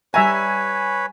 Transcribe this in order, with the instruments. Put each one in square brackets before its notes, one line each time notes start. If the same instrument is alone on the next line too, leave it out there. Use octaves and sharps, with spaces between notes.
[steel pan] G3 E5 A#5 [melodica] B4 C#5 B5 [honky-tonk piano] G#5